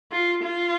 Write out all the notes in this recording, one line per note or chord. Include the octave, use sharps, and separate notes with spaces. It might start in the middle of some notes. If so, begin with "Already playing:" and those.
F4
F4